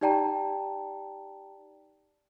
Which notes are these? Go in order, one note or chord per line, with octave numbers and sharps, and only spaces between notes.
D#4 G4 D5 G5 A5 A#5